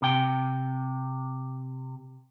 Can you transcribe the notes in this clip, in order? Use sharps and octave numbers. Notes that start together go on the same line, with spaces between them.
C3 G5